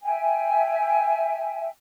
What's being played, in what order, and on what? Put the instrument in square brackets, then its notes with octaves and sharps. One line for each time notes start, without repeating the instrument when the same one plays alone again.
[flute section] E5 G5 G#5